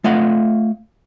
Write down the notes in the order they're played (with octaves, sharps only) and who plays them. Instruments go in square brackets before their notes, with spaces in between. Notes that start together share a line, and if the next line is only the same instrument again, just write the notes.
[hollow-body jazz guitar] A3 F4 D#5 F5 F#5